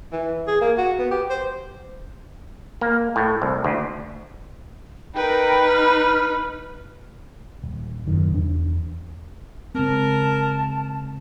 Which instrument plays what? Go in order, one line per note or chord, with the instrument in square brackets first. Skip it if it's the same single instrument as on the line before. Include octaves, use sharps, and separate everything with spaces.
[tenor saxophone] E3
G#4
A#3
F#4
B3
G4
C5
[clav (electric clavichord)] A#3
A2
C2
D2
[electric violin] D#4 B4 [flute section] A#4 G5 B5
[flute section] B5 F6
[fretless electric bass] D#1
F#1 F#2 D#3
E2 D4
[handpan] C#3 G#3 C4 [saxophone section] A#4 [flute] A5